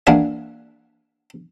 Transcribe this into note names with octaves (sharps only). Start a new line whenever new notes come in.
E3 A#3 D4 F#4 G#4